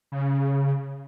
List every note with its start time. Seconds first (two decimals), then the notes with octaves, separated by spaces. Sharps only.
0.12 C#3